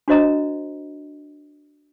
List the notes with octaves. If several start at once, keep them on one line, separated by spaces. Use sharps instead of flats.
D4 F#4 C5 D#5 A#5